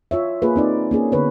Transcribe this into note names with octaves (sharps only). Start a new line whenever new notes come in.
F4 C#5 E5
A#3 F4 G#4 B4
C4 D#4 D5
A#3 C#4 G#4
D3 B3 B4 C#5